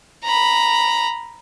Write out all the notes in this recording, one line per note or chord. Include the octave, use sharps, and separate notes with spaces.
A#5 B5